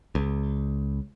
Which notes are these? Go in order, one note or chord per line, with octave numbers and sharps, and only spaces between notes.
C#2